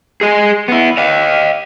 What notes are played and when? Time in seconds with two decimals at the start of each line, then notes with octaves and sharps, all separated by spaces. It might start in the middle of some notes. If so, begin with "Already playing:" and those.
0.21 G#4 D#5
0.68 B3 E4
0.97 D#5 F5